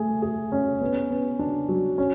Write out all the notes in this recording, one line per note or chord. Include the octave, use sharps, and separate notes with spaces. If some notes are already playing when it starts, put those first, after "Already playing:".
Already playing: A3 G#4
G#4
C#4
B3
B3
D4
F#3
C#4